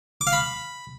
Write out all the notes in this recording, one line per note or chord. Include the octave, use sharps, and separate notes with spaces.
D6
F5
B5